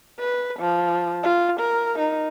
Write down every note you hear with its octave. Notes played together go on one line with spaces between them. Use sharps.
B4
F3
F4
A#4
D#4